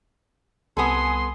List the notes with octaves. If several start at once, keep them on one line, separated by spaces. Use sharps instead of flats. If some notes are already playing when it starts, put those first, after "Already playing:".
C2 B3 A4 G#5 C6 D#6